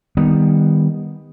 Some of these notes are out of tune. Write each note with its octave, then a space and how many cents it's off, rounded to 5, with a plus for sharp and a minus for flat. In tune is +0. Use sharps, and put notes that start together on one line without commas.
D#3 +0 G3 +20 B3 +0